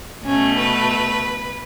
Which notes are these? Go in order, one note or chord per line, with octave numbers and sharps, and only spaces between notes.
B2 A3 C#4
B4